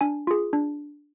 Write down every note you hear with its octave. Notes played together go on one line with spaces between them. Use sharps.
D4 G#5
F4 G#4
D4